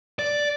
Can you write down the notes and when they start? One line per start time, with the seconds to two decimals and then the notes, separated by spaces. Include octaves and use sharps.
0.19 D5